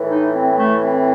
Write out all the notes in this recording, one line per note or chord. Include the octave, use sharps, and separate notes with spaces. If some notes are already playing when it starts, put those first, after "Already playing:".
Already playing: A2 E3
D#4
C4
C4
A3
C4